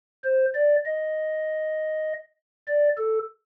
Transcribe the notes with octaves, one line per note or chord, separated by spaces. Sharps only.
C5
D5
D#5
D5
A4